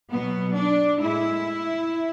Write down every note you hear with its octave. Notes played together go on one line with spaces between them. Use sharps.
B2 F#3 B3
D4
A2 G#3 E4